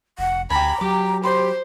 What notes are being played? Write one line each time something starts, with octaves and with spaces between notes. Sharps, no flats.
F1 F#5
D2 G4 G#5 A#5 B5
F#3 G4 D6
G4 C5 B5 C6